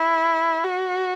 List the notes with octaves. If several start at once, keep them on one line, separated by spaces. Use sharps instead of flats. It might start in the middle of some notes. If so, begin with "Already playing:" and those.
Already playing: E4
F#4